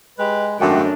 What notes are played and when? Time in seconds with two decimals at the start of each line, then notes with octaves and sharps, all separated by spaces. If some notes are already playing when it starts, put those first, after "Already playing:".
0.19 G#3 G4 B4
0.60 G#1 F#2 A3 D4 F#4 G4